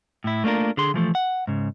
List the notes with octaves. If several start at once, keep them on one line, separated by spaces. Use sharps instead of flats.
A2 E4
A3 A#3 D4 F4 A#4
D3 G#4 C6
E3 F3 A3
F#5
G#2 C#3